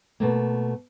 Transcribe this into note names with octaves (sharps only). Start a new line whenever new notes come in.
B2 A3 A#3